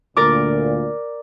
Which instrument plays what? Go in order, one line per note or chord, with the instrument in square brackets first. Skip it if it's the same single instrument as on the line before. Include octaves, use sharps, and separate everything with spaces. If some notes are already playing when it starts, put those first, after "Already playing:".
[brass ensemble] D2 A#2 [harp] A#4 D5 D6